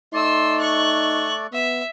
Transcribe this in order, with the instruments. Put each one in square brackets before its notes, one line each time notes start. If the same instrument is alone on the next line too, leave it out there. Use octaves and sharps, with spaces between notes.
[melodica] A3 D5 [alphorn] D#4 [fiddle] C6 E6
[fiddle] C#6 F#6
[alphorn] B3 [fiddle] E5